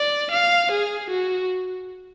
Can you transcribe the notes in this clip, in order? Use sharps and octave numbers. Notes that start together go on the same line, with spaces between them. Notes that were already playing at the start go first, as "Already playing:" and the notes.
Already playing: D5
F5
G#4
F#4